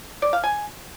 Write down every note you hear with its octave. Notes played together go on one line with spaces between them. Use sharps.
D5
F5
G#5